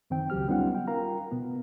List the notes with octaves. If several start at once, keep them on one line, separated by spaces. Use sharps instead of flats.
F#2 D#3 C4 G5
C#2 F#3 G4 F6
G3 B3 C#4 D#4 F4 F#5
G5
F4 A#4 F5 A#5
B2 B3